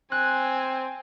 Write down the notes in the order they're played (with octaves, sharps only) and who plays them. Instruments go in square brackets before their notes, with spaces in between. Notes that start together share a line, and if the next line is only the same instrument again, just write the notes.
[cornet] C4 [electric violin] G#5 [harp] F#6